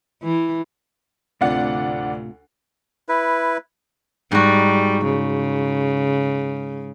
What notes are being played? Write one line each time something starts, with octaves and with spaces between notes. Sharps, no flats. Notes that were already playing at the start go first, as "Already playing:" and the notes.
E3
D2 A2 C3 F4 D5 F#5
E4 B4
G#2 G3 F#4
C#3